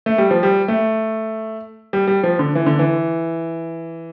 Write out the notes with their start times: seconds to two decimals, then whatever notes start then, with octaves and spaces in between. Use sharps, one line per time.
0.06 A3
0.18 G3
0.31 F3
0.43 G3
0.68 A3
1.93 G3
2.07 G3
2.23 F3
2.39 D3
2.55 E3
2.66 D3
2.79 E3